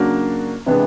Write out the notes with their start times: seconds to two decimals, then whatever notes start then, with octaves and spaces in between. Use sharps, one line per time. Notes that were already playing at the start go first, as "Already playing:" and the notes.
Already playing: C#3 F#3 A#3 D4 F#4
0.66 C3 E3 G#3 B3 D4